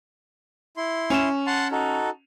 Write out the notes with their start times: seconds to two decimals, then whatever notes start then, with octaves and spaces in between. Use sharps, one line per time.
0.77 E4 C6
1.10 C#4 E7
1.47 F#5 A5 C6
1.72 D#4 F#4 A4